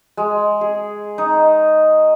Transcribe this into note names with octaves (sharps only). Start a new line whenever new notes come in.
G#3
G#4
D#4